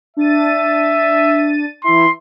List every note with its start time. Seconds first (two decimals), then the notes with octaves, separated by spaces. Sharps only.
0.17 D4 E5 A6 D#7
1.84 E3 E4 C6